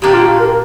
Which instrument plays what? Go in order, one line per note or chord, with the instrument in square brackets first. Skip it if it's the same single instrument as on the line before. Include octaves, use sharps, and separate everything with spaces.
[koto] A#2 A#3 D4 [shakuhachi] G4
[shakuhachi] F4
G4
A#4